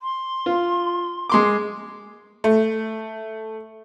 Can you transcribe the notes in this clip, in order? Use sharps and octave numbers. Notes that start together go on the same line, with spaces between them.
C6
F4
G#3 C6 D6
A3